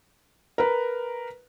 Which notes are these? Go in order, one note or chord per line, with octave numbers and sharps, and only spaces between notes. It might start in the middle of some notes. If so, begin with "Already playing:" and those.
A#4 B4